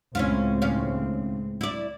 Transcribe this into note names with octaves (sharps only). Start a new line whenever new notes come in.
C#2 A2 C4 C#4 E4 F4
D#2 C#4 F5
E4 D5